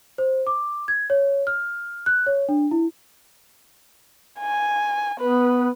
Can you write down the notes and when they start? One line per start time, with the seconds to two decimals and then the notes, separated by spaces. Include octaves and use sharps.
0.18 C5
0.47 D6
0.88 G#6
1.10 C#5
1.47 F6
2.06 F#6
2.26 C#5
2.49 D4
2.71 E4
4.40 G#5
5.20 B3 B4